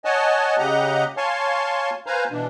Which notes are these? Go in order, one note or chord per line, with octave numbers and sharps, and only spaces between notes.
C#5 D#5 F#5 G#5 A5
C#3 G4 D#5 F#5 A#5
C#5 F5 G#5 A5 C6 C#6
B4 C5 F5 G#5 A#5
B2 E3 D4